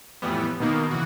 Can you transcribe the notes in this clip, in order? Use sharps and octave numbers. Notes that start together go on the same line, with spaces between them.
F2 A2 E3 G3 B3
B2 D#3 A#3
C#3 E3 F#4